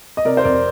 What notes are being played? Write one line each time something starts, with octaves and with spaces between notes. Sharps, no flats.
D#5
C3 A#4 D5
C5
F2 A#4 D5